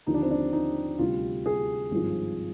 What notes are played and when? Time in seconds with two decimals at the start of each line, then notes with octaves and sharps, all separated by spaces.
0.07 D#2 D3 F3 D#4
0.14 D4
0.22 C4
0.31 D4
0.53 D#4
0.99 D2 C3 G3 F4
1.46 G#4
1.91 G#1 G2 F3